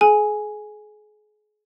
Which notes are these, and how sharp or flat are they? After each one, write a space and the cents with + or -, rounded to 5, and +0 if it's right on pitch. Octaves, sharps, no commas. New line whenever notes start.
G#4 +35 G#5 +0